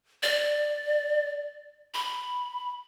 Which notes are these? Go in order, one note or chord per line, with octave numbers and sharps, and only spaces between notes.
D5
B5